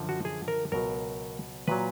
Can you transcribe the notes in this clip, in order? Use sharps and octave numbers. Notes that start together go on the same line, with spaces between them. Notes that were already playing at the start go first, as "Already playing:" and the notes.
Already playing: F#2 D3 F3
F#4
G#4
A#4
C#2 B2 F#3 A#4
A#2 F#3 B4